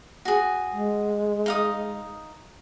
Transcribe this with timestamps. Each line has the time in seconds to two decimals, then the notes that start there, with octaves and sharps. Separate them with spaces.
0.25 F#4 G#4
0.73 G#3
1.46 D#4 F5 D#6